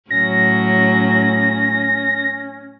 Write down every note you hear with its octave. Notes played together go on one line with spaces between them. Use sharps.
A2 F#3 C#4 A#6